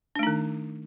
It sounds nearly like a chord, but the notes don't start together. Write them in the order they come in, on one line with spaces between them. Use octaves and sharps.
D4 A3 D#4 D#3